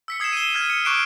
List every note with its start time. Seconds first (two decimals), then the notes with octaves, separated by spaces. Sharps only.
0.08 E6 B6 C#7
0.20 D#6 G#6 C7 C#7 E7
0.32 D#7 E7 G7
0.54 F6 G#6 D#7
0.70 C#7
0.85 C#6 D6 F#6 C7 D7 E7